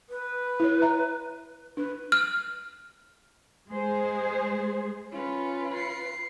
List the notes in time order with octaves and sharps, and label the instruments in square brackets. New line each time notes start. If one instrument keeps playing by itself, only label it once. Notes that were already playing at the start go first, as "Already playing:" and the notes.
[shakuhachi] B4
[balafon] E4 C#5
E5 A#5
[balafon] D4 [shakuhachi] B4
[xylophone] F6
[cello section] G#3 G#4 C5
[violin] C#4 [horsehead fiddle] F4 B4
[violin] C7 C#7